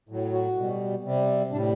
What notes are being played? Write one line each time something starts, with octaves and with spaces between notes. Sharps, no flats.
A2 F#3
F#4
B2 G3
C3 G3
A2 G3 D4